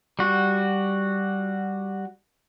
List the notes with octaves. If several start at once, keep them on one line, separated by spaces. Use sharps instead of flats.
G3 F#4